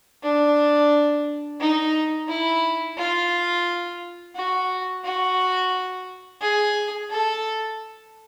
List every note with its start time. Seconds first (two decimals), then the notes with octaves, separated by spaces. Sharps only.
0.23 D4
1.60 D#4
2.28 E4
2.98 F4
4.36 F#4
5.04 F#4
6.41 G#4
7.11 A4